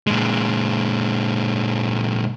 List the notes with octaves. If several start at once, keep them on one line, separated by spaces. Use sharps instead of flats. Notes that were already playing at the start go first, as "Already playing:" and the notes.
A#2 G#3